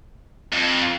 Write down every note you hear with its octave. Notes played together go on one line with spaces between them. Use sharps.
F2